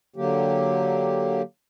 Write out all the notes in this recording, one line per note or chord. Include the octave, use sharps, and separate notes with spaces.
D3 F#3 A#3 G4